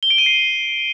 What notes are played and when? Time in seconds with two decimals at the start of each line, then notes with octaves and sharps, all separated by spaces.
0.03 G7
0.10 D7
0.18 D#7
0.26 C7